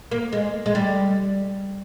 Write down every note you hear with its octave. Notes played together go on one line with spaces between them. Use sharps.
A#3
G#3
G#3
G3